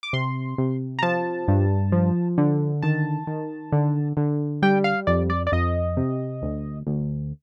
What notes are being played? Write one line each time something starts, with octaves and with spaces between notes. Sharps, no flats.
D6
C3 C6
C3
A#5
F3 A5
G2
F3
D3
D#3 A5
D#3
D3
D3
G3 G5
F5
F2 D5
D5
D5
F2 D#5
C3
D2
D2